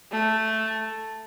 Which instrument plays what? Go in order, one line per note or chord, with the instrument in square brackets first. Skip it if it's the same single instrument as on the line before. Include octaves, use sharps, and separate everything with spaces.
[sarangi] A3